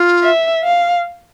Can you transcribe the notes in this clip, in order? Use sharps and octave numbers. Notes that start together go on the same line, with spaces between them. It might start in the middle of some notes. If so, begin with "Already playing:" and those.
Already playing: F4
E5
F5